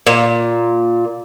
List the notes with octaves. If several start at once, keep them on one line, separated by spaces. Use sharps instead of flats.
A#2